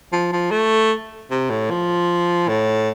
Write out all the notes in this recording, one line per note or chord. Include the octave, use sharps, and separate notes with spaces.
F3
F3
A3
C3
A2
F3
A2